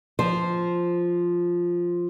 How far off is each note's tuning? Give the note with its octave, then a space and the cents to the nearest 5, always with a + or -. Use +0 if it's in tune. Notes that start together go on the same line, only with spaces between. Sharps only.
F3 +0 C5 +0